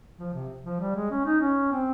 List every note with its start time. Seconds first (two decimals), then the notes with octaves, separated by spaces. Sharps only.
0.18 F3
0.34 C3
0.64 F3
0.80 G3
0.95 G#3
1.11 C#4
1.25 D#4
1.41 C#4
1.72 C4